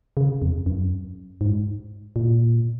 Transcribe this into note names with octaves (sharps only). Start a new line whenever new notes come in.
C#3
F2
F#2
G#2
A#2